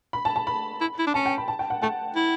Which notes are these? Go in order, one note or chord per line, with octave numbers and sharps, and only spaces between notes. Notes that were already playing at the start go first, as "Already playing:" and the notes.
B5
A5
A5
B5
E4
E4
D4
C#4 A5
G5
B5
A5
G5
F#5
A3 A5
E4